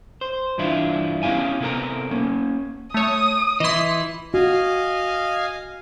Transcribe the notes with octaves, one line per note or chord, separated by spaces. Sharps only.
C5
G2 E3 D4 E4 F4
B3 C#4 E4 G4 F5 G#5
C3 B3 E4 A4 A#4 A#5
A#3 C#4
A3 C#5 D#6
E3 E4 D#5 C6
F#4 D#5 F5 G#5